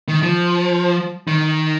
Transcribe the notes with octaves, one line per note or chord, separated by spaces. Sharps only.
D#3
F3
D#3